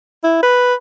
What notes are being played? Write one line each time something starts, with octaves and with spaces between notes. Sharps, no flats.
E4
B4